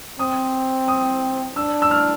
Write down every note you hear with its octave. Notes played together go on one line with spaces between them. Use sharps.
C4 D#6
D#6
D4 E6
E6
F6